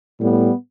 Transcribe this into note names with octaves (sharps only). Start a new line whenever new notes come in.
A2 G3 B3